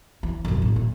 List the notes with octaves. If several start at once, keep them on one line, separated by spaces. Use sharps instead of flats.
E3
E1 F#2
A2
A#2